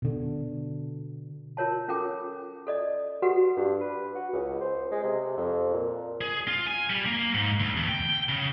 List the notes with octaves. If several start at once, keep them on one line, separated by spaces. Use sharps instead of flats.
B2 D3
F4 A#4 C#5 A5
C#4 F4 A4 A#4 G5 D6
A4 D5 D#5
F#4 G4 A4 B4 F#5
G2
B4
F#4
C#2
C5
G#3
C3
F2
A#2
G#4
F4
G#5
G3
A#3
G#2
D2
E2
G5
C#3